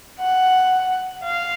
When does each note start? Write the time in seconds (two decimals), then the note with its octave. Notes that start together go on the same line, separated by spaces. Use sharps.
0.20 F#5
1.24 F5